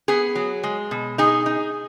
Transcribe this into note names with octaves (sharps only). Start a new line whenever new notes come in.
B3 G#4
F#3
G#3
B2
D#4 G#4
D#4